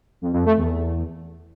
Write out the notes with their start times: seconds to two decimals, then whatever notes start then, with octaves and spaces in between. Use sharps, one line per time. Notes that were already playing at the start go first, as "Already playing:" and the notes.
0.21 F2
0.33 F2
0.45 A3
0.57 E2